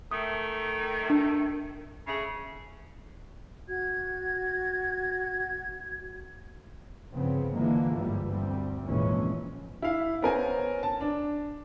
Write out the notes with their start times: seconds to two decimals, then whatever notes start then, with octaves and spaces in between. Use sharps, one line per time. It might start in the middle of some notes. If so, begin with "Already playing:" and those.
0.11 D#3 A3 D#6
1.10 D4
2.08 C#3 A3 G#4
3.67 F#4 G#6
7.13 G1 C#3 F3 B3 C4
7.54 D3 E3 F3 G#3 A#3
7.97 G1 G#2 E3 F3 G3
8.29 D2 G3 C4
8.84 G#1 F2 A#2 E3 G#3 C#4
9.82 E4 F5
10.22 B3 C#4 A#4 C5 G#5
10.83 A5
11.01 D4